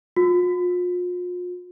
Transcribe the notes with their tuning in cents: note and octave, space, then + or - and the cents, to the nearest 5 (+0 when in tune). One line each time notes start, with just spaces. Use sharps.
F4 +40